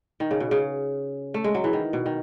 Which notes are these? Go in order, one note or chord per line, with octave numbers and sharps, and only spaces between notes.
D#3
C#3
B2
C#3
A3
G#3
F#3
E3
D#3
B2
D#3